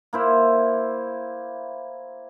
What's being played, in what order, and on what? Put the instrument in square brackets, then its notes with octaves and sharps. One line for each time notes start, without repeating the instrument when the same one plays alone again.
[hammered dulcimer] A#3 E4 C5